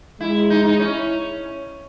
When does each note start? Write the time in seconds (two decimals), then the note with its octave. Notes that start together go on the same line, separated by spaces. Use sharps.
0.21 G#3 E4
0.50 D#4
0.64 D#4
0.79 C#4 E4